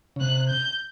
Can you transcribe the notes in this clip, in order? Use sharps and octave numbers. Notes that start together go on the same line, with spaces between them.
C#3
C3 F#6
G6